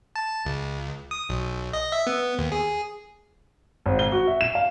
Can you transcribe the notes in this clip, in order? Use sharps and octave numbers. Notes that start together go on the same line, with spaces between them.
A5
C#2
D#6
B1
D#5
E5
B3
D#2
G#4
G#1
G7
F#4
E5
E7
F5